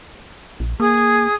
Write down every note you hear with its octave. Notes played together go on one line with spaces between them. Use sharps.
A#1
A#3 G#4 D#6